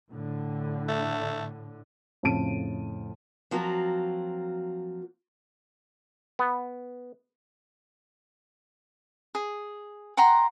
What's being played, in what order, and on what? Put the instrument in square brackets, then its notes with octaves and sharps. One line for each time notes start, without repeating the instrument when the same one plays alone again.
[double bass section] A2 D3
[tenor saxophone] A3
[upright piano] F2 A2 C#3 A5 D7 D#7
[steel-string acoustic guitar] F3 F#3 A#3 C4 F4 F#4
[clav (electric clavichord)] B3
[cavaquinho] G#4
F#5 G5 A#5 C6